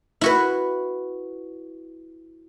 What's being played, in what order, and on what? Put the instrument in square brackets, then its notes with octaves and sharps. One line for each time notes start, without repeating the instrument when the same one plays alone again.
[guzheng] E4 F#4 B4